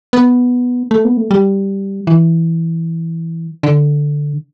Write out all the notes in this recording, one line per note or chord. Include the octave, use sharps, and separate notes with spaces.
B3
A3
B3
A3
G3
E3
D3